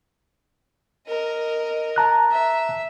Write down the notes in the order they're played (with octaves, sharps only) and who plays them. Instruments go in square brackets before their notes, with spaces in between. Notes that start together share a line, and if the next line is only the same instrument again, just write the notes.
[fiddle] A#4 D#5
[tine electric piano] A5 A#5 F#6
[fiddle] E5